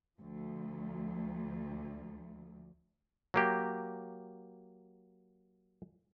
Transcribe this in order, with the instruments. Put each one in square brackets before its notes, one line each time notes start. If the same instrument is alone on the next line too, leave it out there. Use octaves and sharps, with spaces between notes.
[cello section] D2 F3
[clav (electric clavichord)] F#3 A#3 G4